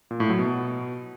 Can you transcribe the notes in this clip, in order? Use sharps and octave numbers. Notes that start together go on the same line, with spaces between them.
A#2
A2
F#3
B2